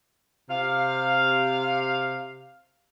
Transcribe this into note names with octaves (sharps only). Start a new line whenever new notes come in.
C3 F5